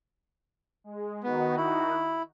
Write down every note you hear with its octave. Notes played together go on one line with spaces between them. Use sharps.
G#3
D#3 B3 D#4 F#4
E4